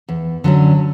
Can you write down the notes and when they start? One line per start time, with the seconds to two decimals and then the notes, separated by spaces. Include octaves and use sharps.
0.09 E2
0.44 D3 F#3 C#4